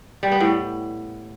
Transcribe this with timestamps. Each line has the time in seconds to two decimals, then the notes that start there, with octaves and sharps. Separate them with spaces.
0.23 G3
0.32 B3
0.41 A2